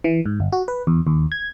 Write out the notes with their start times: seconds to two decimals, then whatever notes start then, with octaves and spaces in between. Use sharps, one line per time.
0.04 E3
0.25 G#2
0.40 G1
0.52 F#4
0.68 B4
0.87 E2
1.07 D#2
1.32 G#6